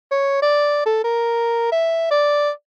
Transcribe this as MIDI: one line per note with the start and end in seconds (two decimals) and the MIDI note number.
0.12 0.42 73
0.42 0.82 74
0.86 1.02 69
1.04 1.71 70
1.72 2.09 76
2.11 2.50 74